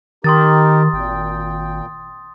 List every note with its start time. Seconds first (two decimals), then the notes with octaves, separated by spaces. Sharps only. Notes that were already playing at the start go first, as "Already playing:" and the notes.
0.24 D#3 D#4 G4 A#4 C6 D#6 A6
0.94 G#1 A#2 G5